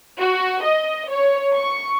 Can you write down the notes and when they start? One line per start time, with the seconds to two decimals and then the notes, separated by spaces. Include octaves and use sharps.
0.19 F#4
0.63 D#5
1.10 C#5
1.56 C#6